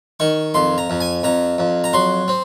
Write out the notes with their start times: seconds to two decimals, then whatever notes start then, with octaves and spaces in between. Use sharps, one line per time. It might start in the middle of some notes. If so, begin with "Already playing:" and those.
0.20 D#3 C#6
0.54 F2 C6
0.78 A#5
0.90 F2
1.00 G#5
1.23 F2 A#5
1.58 F2
1.84 A#5
1.93 F#3 C6
2.28 C4